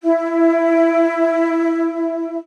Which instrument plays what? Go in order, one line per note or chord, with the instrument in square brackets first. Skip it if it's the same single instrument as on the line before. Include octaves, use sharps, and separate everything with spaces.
[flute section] E4 E5